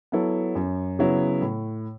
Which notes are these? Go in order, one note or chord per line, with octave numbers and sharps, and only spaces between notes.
F#3 B3 E4 A4
F#2
C#3 F#3 B3 E4
A2